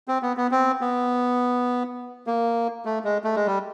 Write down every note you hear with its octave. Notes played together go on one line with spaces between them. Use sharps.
C4
B3
B3
C4
B3
A#3
A3
G#3
A3
G#3
G3